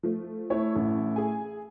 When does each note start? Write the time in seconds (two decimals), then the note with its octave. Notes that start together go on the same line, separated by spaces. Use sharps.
0.03 F3 A3
0.50 A3 E4 C#5
0.76 A1
1.16 G#4 G#5